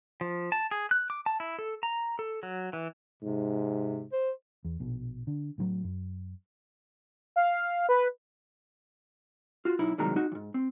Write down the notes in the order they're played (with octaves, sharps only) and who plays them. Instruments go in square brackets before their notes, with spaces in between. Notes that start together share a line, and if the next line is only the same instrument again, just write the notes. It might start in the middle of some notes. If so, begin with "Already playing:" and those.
[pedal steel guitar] F3
A5
G#4
F#6
D6
A5
E4
A4
A#5
A4
F#3
E3
[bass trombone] G#2 [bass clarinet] C3
[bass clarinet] C5
[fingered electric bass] E2
A#1 B2
D3
A2 E3 F#3
F#2
[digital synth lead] F5
B4
[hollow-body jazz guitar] F4 F#4
B1 D#4 E4
C2 A#2 D#3 F#3 G#3 A#5
D#4 F#4
E2 G#2
C4